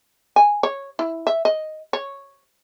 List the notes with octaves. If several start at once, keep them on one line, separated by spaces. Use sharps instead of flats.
G#5
C#5
E4
E5
D#5
C#5